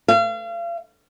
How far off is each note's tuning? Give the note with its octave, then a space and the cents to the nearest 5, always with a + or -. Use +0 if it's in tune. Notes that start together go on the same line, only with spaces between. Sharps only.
F5 -35